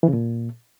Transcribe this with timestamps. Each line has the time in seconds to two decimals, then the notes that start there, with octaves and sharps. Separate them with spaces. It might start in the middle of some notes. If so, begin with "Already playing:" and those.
0.03 E3
0.08 C#3
0.13 A#2